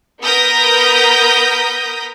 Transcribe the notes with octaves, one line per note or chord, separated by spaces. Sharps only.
B3 A#4 D#6 G6 A#6 B6